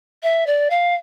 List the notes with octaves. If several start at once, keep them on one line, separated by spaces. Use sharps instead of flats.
E5
D5
F5